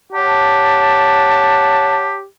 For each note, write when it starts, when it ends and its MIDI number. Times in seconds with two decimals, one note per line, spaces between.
0.13 2.26 67
0.13 2.18 73
0.13 2.18 78
0.13 2.18 81